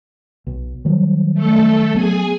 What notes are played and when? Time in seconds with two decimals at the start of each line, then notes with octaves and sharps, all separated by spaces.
0.47 B1
0.85 D#3 F#3 G3
1.34 A3 A4
1.94 F#3 B3 G#4 G#5